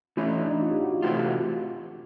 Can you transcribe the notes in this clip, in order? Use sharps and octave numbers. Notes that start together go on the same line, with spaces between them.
E3 A3 C#4 E4
D#4
D4
D#4
F4
G4
F#4
F4
C3 E3 A3 C4 F4 F#4
G4
F#4
F4